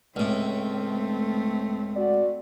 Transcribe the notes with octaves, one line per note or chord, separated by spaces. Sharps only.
C#2 A2 A3 C4
F#4 D5